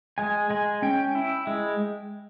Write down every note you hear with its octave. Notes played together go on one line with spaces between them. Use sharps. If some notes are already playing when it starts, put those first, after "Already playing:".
G#3 G#5
G#3 G#5
C#4 G5
E4
G#3